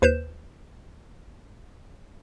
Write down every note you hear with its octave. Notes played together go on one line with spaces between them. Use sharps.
D#2 B4 C5 G6 E7